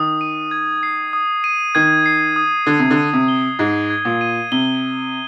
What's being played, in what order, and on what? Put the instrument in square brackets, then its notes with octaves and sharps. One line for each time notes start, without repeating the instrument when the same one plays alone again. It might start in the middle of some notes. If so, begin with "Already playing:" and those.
Already playing: [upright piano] D#3 [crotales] D#6
[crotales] D#7
G#6
C7
D#6
D#7
[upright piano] D#3 [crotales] G#6
[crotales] C7
D#6
[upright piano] D3 [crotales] G#6
[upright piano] C3
D3
[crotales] D#7
[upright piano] C3
[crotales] G7
[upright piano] G#2 [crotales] G#6
[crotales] G#6
[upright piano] A#2
[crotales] D#7
[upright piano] C3 [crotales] G7